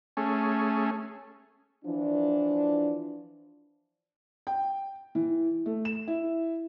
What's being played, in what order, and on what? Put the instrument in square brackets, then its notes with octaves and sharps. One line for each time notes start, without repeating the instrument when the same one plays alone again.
[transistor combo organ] A3 C#4 G#4
[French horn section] E3 F3 D4
[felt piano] G5
E3
A3
E7
E4